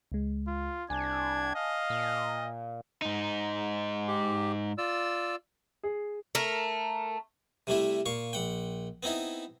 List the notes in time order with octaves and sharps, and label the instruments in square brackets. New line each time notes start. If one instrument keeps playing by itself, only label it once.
[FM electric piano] C#2 G#3
[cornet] F4
[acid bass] C2 [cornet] D4 [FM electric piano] G#5 A5 [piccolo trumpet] G#6
[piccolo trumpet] D#5 [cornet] F5
[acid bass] A#2
[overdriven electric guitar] G#2 D#4
[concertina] G4
F4 D5 E6
[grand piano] G#4
[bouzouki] A3 A#4
[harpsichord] C3 G3 A3 E4
A#2 F5 C#6
A#1 F#5 G5
B3 C4 D#4 E4